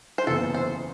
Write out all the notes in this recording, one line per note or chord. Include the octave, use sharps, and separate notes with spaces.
C5
F#1 E2 C#3 E3 A4
C5